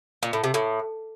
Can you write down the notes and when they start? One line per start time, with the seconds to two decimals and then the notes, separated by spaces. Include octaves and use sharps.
0.23 A#2
0.33 A2
0.44 C3
0.54 A2